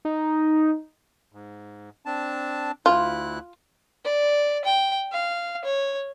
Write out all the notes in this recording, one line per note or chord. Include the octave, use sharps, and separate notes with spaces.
D#4
G#2
C4 D4 A5
D2 E4 F4 F#6
D5
G5
F5
C#5